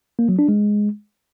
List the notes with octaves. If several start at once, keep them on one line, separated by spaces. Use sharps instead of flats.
A#3
F#3
D4
G#3